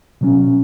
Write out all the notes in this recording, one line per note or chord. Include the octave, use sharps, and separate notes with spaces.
B2 F#3 C#4